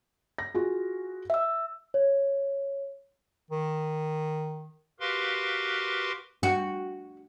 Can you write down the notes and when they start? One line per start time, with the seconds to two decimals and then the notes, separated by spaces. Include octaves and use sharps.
0.38 A#6
0.54 F4 F#4 G#4
1.30 E5 E6
1.94 C#5
3.51 D#3
5.00 F#4 G4 A#4 B4 F5 C6
6.43 F#4